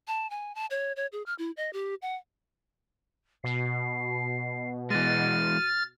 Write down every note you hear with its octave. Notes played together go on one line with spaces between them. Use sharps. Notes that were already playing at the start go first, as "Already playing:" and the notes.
A5
G#5
A5
C#5
C#5
G#4
F6
E4
D#5
G4
F#5
B2 C7
E3 G#3 F6 A6 D#7